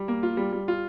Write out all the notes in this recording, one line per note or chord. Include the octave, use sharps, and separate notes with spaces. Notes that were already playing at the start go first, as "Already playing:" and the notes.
Already playing: G3
A#3
F4
G3
G3
F4